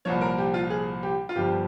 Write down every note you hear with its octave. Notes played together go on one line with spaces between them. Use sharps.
C2 A#2 F3 C#5
A#4
G4
F4
G#4
G4
F4
G1 G2 F3 G4